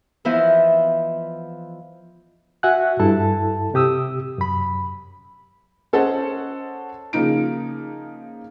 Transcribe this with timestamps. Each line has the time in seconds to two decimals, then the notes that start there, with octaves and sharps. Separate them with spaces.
0.25 E3 F3 B3 E4 C5 D#5
2.63 F#4 E5 F#5 G#5 F#6
3.00 G2 E4 A4 A5
3.74 C3 G4 D#6 E6
4.38 F#2 B5
5.93 C#4 A4 C5 D#5 F#5
7.13 C#3 F3 A#3 D#4 D7